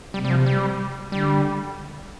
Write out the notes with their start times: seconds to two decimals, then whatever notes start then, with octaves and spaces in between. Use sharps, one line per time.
0.14 C3 G3
0.25 G3
0.30 F3
0.46 G3
1.12 D3 G3